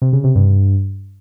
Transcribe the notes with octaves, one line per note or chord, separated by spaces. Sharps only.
C3
C#3
C3
G2